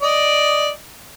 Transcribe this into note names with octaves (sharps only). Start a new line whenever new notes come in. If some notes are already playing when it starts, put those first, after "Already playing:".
D5 D#5